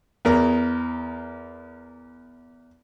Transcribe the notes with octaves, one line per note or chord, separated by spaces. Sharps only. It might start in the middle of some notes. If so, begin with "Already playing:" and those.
E2 A#4